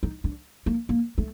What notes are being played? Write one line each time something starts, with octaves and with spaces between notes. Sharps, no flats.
D#4
D4
A#3
A#3
A3